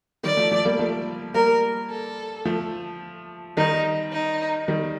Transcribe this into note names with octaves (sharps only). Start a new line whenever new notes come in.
D#3 G3 D5
F3 A3
F3 A3
G3 A#3
F3 A3
G3 A#3 A#4
A4
F3 A3
D#3 G3 D#4
D#4
D#3 G3